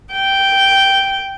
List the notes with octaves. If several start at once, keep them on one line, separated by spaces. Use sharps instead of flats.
G5